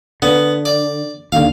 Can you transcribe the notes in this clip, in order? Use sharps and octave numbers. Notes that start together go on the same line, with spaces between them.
D3 B3
D5
D#2 D3 F5